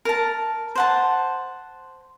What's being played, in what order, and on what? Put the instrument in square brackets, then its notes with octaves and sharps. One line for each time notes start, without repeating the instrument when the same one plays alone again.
[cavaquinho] A#4 A5
C5 F#5 A5